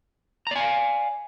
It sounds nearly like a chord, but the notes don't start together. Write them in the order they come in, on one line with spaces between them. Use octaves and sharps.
A#5 D5 G#5 F5